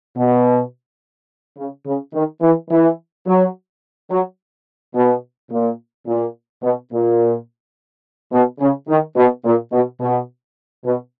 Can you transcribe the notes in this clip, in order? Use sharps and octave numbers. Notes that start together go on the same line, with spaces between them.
B2
C#3
C#3
D#3
E3
E3
F#3
F#3
B2
A#2
A#2
B2
A#2
B2
C#3
D#3
B2
A#2
B2
B2
B2